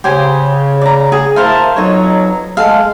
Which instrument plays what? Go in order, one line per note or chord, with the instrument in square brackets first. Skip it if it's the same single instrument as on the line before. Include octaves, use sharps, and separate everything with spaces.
[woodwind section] C#3 [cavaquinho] G4 C5 G#5
[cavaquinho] D5 A#5
G#4
[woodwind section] E4 E5 A5 [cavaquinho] A#4 C5 F5
[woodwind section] F2 B2 F#3 [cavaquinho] D#4 C#5
[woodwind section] G#3 [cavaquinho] A4 F5